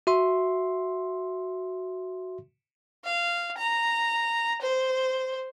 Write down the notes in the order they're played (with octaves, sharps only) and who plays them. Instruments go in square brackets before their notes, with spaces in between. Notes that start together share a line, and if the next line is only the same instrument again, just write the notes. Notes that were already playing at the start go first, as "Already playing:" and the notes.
[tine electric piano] F#4 E5 C6
[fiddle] F5
A#5
C5